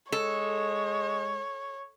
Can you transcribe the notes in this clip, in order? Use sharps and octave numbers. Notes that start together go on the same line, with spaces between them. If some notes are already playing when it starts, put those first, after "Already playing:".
G#3 A4 C#5